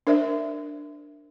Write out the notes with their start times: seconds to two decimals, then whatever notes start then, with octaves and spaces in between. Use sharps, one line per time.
0.07 D4 A#4 C5 D5 E5